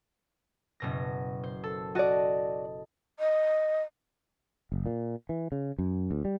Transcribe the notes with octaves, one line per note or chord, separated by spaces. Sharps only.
F#1 B2 A#6
C5
A4
F#4 D5 D#5 A5
D#5
F#1
A#2
E3
C#3
F#2
D2
G3